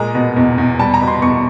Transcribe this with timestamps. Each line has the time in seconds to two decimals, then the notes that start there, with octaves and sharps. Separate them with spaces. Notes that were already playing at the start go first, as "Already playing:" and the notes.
Already playing: A#2 G#3 A#5
0.15 B2
0.36 E2
0.58 E2
0.79 G3 A5
0.94 A#5
1.01 B2
1.08 C6
1.22 E2 C#6